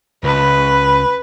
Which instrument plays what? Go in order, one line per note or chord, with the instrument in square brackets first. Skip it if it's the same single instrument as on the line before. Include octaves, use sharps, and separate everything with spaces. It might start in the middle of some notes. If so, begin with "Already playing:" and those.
[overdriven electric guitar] C#2 [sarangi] B4